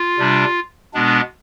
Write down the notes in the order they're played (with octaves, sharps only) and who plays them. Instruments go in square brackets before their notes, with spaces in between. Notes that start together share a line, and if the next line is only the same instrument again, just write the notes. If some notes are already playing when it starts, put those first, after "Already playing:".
Already playing: [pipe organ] F4
C3 G3 D4
B2 G#3 B3 D4